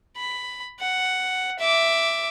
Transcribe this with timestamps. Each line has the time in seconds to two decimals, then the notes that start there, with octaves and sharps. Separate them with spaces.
0.17 B5
0.80 F#5
1.59 E5 D6